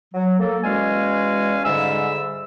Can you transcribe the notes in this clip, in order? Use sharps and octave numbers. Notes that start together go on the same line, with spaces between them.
F#3
A#3 A4
E2 G#3 C#4 F#4 F5 G#5
G#2 D3 G3 E5 E6